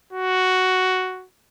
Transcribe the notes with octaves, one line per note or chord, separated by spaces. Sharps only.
F#4